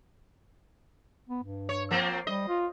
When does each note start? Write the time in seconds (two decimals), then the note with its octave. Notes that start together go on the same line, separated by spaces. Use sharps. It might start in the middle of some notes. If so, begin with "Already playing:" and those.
1.29 B3
1.44 G2
1.69 C#5
1.91 F3 A#3 C4
2.27 G3 D#5
2.48 F4